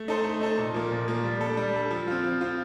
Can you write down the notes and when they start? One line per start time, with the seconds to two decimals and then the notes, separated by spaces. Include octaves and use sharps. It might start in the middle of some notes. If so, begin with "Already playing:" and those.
Already playing: A3
0.08 D#4 A4 C5
0.24 A3
0.41 D#4 A4 C5
0.58 A#2
0.74 F3 A#3
0.91 A#2
1.08 F3 A#3
1.24 G3
1.41 D4 A4
1.57 G3
1.74 D4 A4
1.91 F3
2.08 C4 F4
2.24 F3
2.41 C4 F4